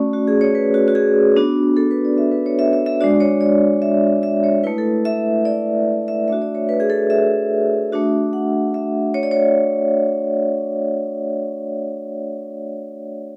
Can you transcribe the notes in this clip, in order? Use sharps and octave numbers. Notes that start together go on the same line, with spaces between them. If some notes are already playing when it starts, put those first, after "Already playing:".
Already playing: A3 C#4 F#4 D5
F#4
G#4
C#5
B4
F#4
F#4
G#4
B3 D4 F#4
A4
B4
D5
E5
B4
C#5
E5
E5
E5
G#3 D4 F#4 D5
C#5
D5
E5
E5
C#5
A3 E4 B4
A4
E5
D5
E5
A3 D4 F#4 E5
D5
C#5
B4
G#4
A4
E5
A3 D4 F#4
F#5
E5
C#5
D5
C#5